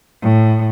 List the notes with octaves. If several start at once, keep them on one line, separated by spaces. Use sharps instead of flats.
A2